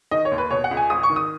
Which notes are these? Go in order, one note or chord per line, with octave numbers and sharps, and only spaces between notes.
D#3 D#5
C#5
D#2
B4
B2 C#5
F#5
C#2
G#5
G#1 D#6
C#6
D#3
D#6